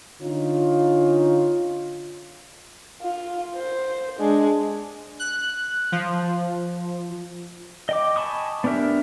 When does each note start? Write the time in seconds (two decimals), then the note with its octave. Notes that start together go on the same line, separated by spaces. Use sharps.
0.21 D3 C#4 D#4 F4
3.02 F4
3.56 C5
4.19 G#3 D4
5.20 F#6
5.92 F3
7.89 D#5 G5 D6
8.16 G#5 A5 B5 C#6 D#6
8.64 B3 D4 G4 A#4 E5